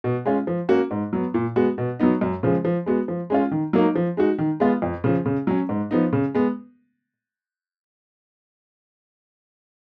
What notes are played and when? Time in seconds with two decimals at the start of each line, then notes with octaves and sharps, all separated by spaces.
0.04 B2
0.25 G#3 C#4 F4
0.47 F3
0.69 A#3 C#4 F#4
0.91 G#2
1.13 F#3 B3
1.34 A#2
1.56 G#3 B3 F#4
1.78 B2
1.99 F#3 B3 D#4
2.21 F#2
2.43 C#3 F3 G#3
2.65 F3
2.86 G#3 B3 F#4
3.08 F3
3.30 G#3 C#4 F4
3.51 D#3
3.73 F#3 A#3 D#4
3.95 F3
4.17 G#3 D#4 F#4
4.38 D#3
4.60 G#3 B3 F4
4.82 F2
5.04 C#3 F3
5.26 C#3
5.47 F#3 C#4
5.69 G#2
5.91 F3 B3 D#4
6.13 C#3
6.35 G#3 B3